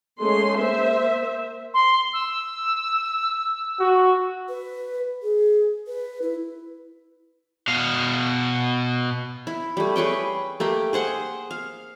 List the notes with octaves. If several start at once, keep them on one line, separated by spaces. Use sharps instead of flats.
G#3 A3 C#4 G#4 C6
A#3 A#4 C5 E5
C6
E6
F#4
B4
G#4
B4
E4
B2 F5
E4
G3 A3
G#4 B4 C#5 G5
A3 A#3 G4
G#4 C5 F#5 C6
F5